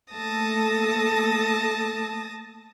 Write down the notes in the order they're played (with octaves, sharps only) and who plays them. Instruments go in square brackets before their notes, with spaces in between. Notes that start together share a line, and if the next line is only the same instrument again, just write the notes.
[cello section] A3 A#3 A4 [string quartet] A5 D#6 A#6